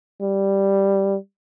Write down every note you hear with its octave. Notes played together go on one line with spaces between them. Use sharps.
G3